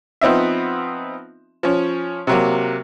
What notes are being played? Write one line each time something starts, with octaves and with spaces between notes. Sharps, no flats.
F3 B3 C4 D#4 E5
F3 C#4
C3 F#3 A#3